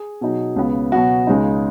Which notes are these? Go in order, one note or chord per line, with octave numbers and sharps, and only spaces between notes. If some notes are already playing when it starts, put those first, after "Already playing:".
Already playing: G#4
B2 F#3 D#4
C#2 C#3 B3
B2 F#3 B3 F#4
C#2 C#3 G#3 D#4